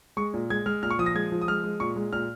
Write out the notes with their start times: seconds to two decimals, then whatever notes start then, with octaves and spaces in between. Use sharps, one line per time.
0.17 G#3 C#6
0.34 A#2
0.50 G#3 G#6
0.66 G#3 F6
0.83 A#2 F6
0.91 C#6
0.99 F3 D#6
1.06 A#6
1.15 G#3 G#6
1.32 F3
1.41 D#6
1.48 G#3 F6
1.64 G#3
1.80 A#2 C#6
1.96 G#3
2.13 A#2 F6